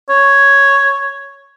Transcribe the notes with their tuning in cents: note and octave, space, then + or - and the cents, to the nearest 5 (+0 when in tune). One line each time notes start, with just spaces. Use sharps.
C#5 +0